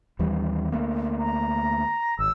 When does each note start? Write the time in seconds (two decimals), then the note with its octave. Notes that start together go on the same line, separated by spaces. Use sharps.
0.19 D#2 E3 G3
0.72 D2 A3 A#3
1.18 A#5
2.19 G#1 E6